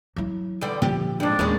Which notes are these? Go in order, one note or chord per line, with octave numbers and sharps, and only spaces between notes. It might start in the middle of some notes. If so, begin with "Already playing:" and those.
F#3 E4
E2 D3 G3
A#2 D3 F3 G3 G4
F2 G#2 D4
D#2 A2 G#3 C#4